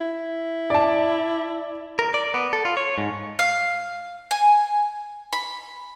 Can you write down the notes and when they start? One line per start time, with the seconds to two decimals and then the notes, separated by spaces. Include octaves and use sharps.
0.01 E4
0.70 D5 A5
1.99 A#4
2.14 D5
2.34 B3
2.53 A4
2.65 F4
2.77 C#5
2.98 G#2
3.39 F5
4.31 G#5
5.33 B5